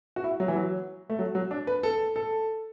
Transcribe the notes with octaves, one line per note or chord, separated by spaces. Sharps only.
F#4
E4
F#3
E3
F#3
A3
F#3
F#3
D4
B4
A4
A4